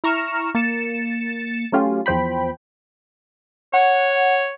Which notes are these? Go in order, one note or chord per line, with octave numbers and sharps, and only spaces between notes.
E4 A#5 C#6 F6 E7
A#3 A6 C#7 E7
F#3 A3 C#4 F4 G4
E2 F3 C5 G5 B5
C#5 F#5